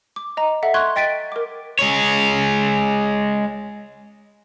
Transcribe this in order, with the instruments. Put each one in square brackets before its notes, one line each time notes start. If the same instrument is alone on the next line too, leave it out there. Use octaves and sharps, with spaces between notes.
[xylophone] D6
D#5 A#5
A4 E5 F#5
C6 C#6 F#6 G#6
D#5 G5 A6 B6 D7 D#7
A#4 D6
[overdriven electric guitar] G#3 C#5